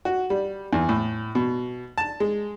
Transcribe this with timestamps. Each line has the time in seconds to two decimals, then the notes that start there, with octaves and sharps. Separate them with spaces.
0.05 F#4
0.30 G3
0.73 E2
0.89 A2
1.35 B2
1.98 A5
2.20 G#3